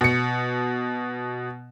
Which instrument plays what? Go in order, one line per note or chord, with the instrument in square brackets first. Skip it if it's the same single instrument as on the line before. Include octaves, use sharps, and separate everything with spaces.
[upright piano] B2 C#7